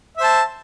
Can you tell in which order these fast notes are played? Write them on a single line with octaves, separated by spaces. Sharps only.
E5 C5 A5